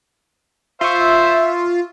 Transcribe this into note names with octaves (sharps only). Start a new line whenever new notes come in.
F4 C5 E5 C6 C#6